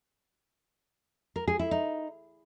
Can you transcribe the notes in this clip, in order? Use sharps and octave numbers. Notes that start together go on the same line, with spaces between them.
A#4
G#4
E4
D#4